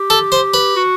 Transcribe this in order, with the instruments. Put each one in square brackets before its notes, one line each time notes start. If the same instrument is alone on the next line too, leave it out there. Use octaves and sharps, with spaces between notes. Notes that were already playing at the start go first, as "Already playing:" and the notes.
Already playing: [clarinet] G4
[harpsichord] A4
C5
B4
[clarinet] F#4